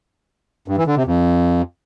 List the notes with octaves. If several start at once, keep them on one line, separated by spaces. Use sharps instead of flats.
G2
E3
D3
C3
F2